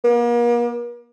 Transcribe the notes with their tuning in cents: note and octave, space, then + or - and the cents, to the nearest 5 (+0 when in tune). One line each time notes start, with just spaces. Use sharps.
A#3 +40